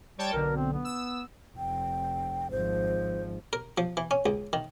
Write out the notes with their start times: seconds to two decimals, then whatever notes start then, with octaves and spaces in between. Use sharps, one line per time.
0.18 G3 C#5 G5 A5
0.33 B1 D3 A#4
0.56 C4
0.73 B3
0.85 E6
1.57 F1 G5
2.51 G#1 F3 C5
3.53 A#4
3.78 F3
3.97 E3
4.11 C#4
4.26 C#2
4.53 D#3